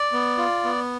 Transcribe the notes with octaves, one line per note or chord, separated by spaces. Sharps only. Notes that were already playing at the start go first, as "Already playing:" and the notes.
Already playing: D5
B3
F4
B3